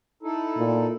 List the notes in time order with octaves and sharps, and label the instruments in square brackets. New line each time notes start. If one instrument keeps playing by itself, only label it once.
[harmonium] D#4 E4 A4
[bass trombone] A#2